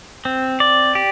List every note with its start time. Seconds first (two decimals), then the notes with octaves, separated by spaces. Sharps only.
0.25 C4
0.60 D5
0.95 G4